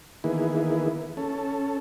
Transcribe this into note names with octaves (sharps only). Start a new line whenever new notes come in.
D#3 E3 A#3 B3 E4 G#4
C#4 A4